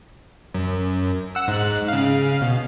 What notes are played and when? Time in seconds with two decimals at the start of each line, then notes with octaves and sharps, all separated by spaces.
0.54 F#2
1.35 F#5 E6
1.48 G#2 F#6
1.88 C#3 F5
2.42 B2